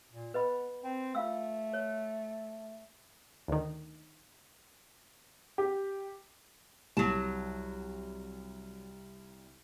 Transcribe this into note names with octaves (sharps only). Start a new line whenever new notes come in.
A#2
B3 B4 D#5 B5
C4
A3 F4 F5 E6
C#5
D2 D#3
G4
C2 F#3 A5